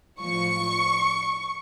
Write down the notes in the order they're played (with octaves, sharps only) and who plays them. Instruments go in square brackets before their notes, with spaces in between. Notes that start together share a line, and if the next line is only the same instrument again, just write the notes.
[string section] A2 F3 C#6